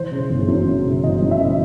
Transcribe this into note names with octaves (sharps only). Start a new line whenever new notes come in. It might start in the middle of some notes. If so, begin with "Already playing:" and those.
Already playing: E3 C5
C#3
G1
F#2
E3
C#3
G1 D#5
F#2
E5
E3